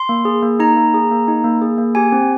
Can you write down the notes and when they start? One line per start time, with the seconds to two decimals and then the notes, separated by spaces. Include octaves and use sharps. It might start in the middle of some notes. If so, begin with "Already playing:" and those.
Already playing: C6
0.09 A#3
0.25 G#4
0.43 A#3
0.60 D#4 A#5
0.76 A#3
0.94 G#4
1.11 A#3
1.28 D#4
1.44 A#3
1.62 G#4
1.78 A#3
1.95 G4 G#5
2.12 C4